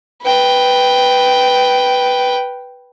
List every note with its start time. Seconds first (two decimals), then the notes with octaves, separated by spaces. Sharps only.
0.23 B4 G5